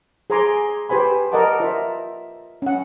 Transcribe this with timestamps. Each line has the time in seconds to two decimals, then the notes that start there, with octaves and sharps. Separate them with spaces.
0.30 G#4 C5 G#5 A#5 C6 D6
0.89 G4 B4 C5 G#5 B5
1.32 A#4 D5 D#5 F#5 A5 D6
1.60 F4 C5 E5
2.62 C#4 F#5